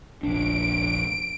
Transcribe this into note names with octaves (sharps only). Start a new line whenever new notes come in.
F1 A#1 D4 D7